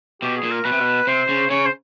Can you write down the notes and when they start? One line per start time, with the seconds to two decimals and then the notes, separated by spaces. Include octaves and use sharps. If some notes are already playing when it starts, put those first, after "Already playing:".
0.22 B2 G4
0.37 G#4
0.43 A#2
0.51 A#4
0.65 B2 B4
0.72 C3
0.80 B2
1.07 C3 C5
1.29 C#3
1.50 C#3 C#5
1.66 C5